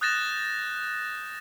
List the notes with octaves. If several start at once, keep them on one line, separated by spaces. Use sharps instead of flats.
D#6 F#6 G6 A6 A#6 E7